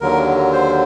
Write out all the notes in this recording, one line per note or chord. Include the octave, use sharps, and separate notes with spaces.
D#2 D3 F#3 A#4
C5